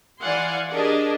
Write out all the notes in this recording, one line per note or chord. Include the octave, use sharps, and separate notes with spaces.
E3 D5 F5 F#5 G#5 C6
D4 G4 G#4 A#4 D5 D#5